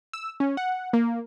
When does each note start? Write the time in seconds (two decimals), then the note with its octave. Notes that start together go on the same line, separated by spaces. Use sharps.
0.13 E6
0.40 C#4
0.57 F#5
0.93 A#3